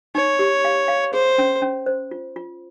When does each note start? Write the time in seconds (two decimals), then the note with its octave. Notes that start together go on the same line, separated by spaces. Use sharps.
0.15 D#4 C#5
0.39 G4
0.65 F5
0.88 F5
1.13 G#4 C5
1.38 C#4
1.62 C#4
1.86 C5
2.11 F4
2.36 F4